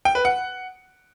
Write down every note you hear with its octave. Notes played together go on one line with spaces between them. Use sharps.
G5
B4
F#5